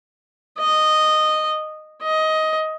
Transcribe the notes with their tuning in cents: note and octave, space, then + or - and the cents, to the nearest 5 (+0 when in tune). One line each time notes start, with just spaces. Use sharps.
D#5 -10
D#5 +15